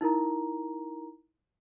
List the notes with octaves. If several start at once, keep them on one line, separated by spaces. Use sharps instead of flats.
D#4 E4 A#4 A#5